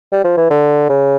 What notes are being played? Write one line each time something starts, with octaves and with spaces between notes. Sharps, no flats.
G3
F3
E3
D3
C#3